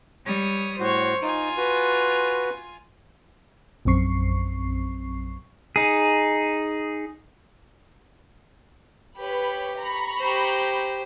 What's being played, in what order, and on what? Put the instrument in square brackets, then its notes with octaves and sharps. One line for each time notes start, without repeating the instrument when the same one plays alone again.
[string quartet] G3 C#5 D#6
[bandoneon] A2 F#4 [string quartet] C5 C#5
[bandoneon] D#4 [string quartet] F4 G#5
[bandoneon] F#4 B4
[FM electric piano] A#1 F#2 C4 C#6 C7
[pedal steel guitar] D#4 G#4
[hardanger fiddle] G4 [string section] B4 C#5 B5
[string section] A#5 B5 C#6
[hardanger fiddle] G4 C5